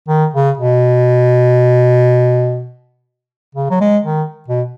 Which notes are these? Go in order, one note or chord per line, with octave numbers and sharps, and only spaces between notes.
D#3
C#3
B2
C#3
F#3
G#3
D#3
B2